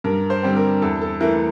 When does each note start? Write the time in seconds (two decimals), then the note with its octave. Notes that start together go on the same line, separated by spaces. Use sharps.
0.04 G2 A#4
0.30 C5
0.43 D3 G3 C4
0.56 A#4
0.82 E2 A4
1.02 A4
1.20 E3 A3 A#4